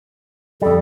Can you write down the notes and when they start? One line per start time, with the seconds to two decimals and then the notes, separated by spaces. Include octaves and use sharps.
0.62 F2 G3 A4